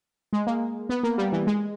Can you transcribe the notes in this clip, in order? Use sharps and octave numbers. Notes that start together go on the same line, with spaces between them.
G#3
A#3
B3
A#3
G3
E3
G#3